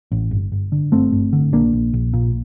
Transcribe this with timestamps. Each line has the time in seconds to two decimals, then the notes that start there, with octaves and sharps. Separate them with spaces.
0.12 A1
0.31 G1
0.52 G1
0.72 D3
0.92 G1 A3 C4
1.12 G1
1.33 D3
1.52 A#1 A#3 D4
1.73 A#1
1.93 A#1
2.14 A#2